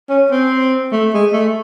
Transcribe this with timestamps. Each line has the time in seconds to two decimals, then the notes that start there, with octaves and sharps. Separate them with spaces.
0.10 C#4
0.31 C4
0.92 A3
1.14 G#3
1.33 A3